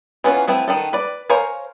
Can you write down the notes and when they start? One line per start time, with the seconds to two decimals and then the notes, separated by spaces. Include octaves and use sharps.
0.24 E3 B3 C#4 F4
0.48 A3 B3 C4 E4
0.68 D#3 B3 A4
0.93 B4 D5
1.30 A#4 C5 C#5 F5 G#5